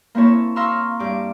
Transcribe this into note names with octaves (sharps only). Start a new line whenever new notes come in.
A#3 C4 E4 C#5 A5
F5 A#5 C6 C#6 E6 F6
G2 D6